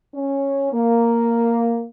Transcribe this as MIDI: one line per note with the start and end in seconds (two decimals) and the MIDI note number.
0.15 0.71 61
0.73 1.84 58